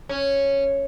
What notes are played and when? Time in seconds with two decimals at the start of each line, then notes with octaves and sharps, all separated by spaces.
0.09 C#4